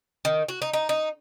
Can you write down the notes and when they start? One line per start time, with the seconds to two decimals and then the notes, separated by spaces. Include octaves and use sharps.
0.25 D#3
0.48 F#4
0.62 D#4
0.73 D#4
0.89 D#4